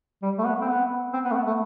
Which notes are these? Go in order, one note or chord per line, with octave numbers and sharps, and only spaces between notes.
G3
A3
B3
C4
B3
C4
B3
A3
B3
A3